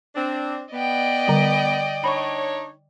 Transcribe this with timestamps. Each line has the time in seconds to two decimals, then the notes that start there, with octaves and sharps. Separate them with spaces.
0.15 C4 D4
0.72 B3 D5 D#5 G5
1.28 D3 G3
2.04 D4 D#4 C#5 B5 C#6